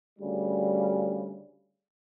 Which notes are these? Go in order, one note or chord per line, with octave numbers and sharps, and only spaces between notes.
D2 C#3 G3